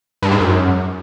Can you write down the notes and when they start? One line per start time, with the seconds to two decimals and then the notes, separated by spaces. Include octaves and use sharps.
0.22 G2
0.31 G#2
0.40 F#2